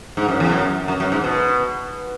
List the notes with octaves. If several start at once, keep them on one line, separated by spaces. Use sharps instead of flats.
G#2
F#2
E2
F#2
F#2
F#2
G#2
B2